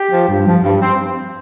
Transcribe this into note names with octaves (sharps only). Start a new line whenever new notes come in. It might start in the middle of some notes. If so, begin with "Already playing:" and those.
Already playing: G4
F3
G2
F3
G2
C4